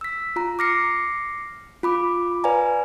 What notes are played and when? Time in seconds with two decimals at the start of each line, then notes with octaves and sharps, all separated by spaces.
0.01 E6 B6
0.36 F4 A#5
0.59 D6 F6 A#6 C7 C#7
1.83 F4 B5 D6
2.44 B4 D5 F5 G#5 A#5